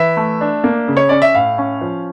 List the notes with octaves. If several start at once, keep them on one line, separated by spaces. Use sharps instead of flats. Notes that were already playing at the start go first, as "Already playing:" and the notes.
Already playing: E3 E5
A3
D4
A#3
C#3
C#5
C#4 D5
E5
A2 F5
C#4
F3